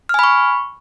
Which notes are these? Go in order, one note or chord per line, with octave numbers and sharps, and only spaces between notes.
G#5 B5 C#6 F6